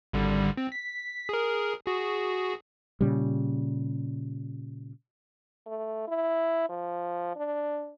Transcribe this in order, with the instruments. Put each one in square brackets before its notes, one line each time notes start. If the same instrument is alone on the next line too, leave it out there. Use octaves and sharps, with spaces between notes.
[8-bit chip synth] G#1 D3 G3
C4
B6
G#4 A#4
F#4 G#4
[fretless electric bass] A#2 C#3 G3
[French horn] A3
E4
F3
D4